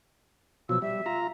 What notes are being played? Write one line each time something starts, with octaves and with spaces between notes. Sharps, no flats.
B2 F3 F#3 E6
G3 E5
F4 A#5